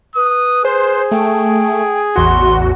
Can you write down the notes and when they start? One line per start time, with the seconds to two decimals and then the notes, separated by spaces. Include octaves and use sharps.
0.15 B4 D#6
0.65 G#4 C5
1.11 A3 G5
2.16 A1 E2 F#4 C6